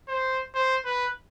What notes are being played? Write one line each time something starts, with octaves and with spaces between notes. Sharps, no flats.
C5
C5
B4